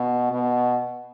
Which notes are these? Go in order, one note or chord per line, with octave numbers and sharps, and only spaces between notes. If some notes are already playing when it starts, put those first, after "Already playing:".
Already playing: B2
B2